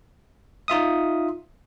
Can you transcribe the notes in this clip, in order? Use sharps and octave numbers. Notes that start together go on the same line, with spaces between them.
D#4 F4 E5 D#6